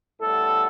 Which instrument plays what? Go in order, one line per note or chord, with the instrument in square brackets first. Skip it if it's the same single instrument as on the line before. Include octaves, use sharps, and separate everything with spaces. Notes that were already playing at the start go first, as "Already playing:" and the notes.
[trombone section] A2 G3 B3 A4